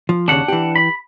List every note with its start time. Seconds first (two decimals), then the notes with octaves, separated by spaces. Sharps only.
0.09 F3
0.28 D#2 C#3 D4 F#5
0.48 E3 G4
0.76 B5